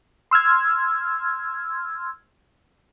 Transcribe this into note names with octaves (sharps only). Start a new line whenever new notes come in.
C6 E6 F6 G#6